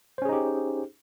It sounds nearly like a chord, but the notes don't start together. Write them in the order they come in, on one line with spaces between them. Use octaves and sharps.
C5 C#4 G#4 D#4 G4